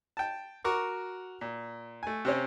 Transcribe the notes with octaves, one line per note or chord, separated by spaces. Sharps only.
G5 A5
F#4 A#4 C#6 D6
A#2
A3 G#5
C3 C4 C#4